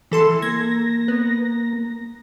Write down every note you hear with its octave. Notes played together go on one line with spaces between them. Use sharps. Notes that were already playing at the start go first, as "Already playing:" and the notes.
E3 A4 C6 E6
A#3 G#6 A#6
B3